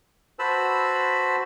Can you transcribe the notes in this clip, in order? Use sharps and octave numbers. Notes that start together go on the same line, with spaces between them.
F#4 B4 C5 A5 B5 E6